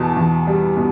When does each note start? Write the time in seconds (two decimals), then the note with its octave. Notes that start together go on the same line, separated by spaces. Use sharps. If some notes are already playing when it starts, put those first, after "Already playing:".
Already playing: E2 B2 A5
0.17 E2
0.47 G3
0.77 B2